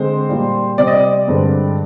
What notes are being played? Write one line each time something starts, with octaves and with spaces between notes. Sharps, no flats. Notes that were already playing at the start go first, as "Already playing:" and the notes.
Already playing: D3 G#3 C4 C5
A#2 G3 A#3
C3 G3 C4 D5
D#5
D5
G2 D3 G#3 C4